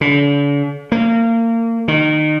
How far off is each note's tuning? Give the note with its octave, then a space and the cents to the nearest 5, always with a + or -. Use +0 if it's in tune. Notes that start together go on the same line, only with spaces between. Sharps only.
D3 -45
A#3 -30
D#3 -25